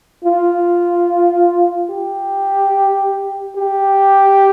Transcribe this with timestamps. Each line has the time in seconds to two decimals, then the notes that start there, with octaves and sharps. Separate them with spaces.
0.25 F4
1.90 G4
3.56 G4